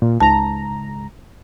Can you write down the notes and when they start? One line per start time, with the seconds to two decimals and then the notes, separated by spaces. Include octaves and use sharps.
0.02 A#2
0.20 C#2 G#2 A5 A#5